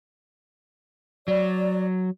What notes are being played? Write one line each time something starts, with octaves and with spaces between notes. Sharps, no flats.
F#3 D5